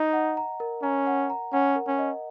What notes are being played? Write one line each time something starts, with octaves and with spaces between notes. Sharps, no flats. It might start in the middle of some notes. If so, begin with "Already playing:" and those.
Already playing: D#4 D#5 A#5
F#5
A#5
A#4
C#4 A#5
F#5
A#5
C#4 F#5
A#4
C#4
D#5